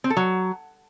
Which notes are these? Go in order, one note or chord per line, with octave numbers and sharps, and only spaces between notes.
C4
A4
F#3